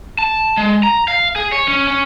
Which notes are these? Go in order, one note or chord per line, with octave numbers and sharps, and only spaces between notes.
A5
G#3
A#5
F5
G#4
C#5
C#4
C#4